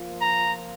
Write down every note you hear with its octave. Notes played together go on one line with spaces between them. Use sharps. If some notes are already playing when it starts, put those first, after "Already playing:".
Already playing: F3 A#3 F4
A#5